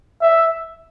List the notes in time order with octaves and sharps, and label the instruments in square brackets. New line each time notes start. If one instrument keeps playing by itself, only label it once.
[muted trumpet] E5